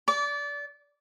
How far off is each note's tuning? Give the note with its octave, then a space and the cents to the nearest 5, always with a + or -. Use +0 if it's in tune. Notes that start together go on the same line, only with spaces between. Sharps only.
D5 -25 D6 -35